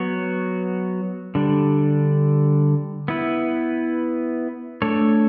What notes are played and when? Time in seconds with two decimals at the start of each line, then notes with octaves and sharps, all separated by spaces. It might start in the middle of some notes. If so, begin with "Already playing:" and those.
Already playing: F#3 B3 F#4 C#5
1.35 D3 G3 D4
3.08 B3 E4 B4
4.82 A3 D4 A4 C#5